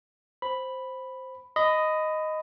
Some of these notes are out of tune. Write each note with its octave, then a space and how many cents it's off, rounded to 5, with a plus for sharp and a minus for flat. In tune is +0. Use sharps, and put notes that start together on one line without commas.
C5 +0 B5 +0
D#5 +0 B5 +25